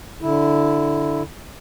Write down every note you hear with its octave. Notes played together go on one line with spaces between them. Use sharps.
D3 E4